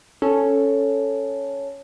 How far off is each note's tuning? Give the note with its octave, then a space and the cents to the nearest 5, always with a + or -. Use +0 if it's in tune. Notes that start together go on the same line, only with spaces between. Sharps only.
C#4 +0 A4 +0